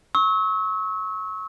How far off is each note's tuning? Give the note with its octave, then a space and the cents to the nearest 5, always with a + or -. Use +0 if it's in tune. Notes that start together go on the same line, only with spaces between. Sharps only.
C#6 -15 E6 -35